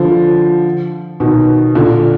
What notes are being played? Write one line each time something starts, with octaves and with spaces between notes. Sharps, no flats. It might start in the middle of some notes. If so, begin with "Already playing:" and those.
Already playing: D3 F3
B2 D#3
A#2 D3